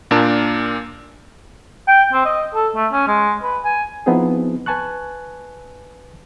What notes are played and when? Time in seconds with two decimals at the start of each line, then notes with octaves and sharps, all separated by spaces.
0.11 A#2 D4 A#4 A5
1.88 G5
2.13 C4
2.25 D#5
2.55 A4
2.75 A3
2.92 C#4
3.07 G#3
3.43 B4
3.64 G#5
4.06 F3 B3 C4 D#4 E4 G#4
4.66 B4 G#5 A5 C#6 F#6